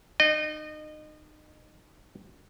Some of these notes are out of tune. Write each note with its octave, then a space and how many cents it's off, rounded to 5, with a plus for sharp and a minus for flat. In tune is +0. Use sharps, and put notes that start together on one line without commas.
D#4 -30 D#5 -25